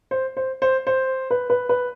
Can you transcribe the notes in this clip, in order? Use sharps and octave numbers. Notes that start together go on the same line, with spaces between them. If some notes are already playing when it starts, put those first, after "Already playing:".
C5
C5
C5
C5
B4
B4
B4